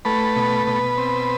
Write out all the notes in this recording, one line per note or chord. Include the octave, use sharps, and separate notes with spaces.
A3 B4
B2
B2
C4